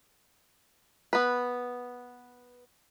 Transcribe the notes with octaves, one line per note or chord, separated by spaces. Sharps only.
B3 B4